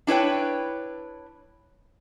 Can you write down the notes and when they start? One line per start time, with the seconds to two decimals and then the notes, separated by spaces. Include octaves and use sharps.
0.07 D4 E4 B4 C#5 G5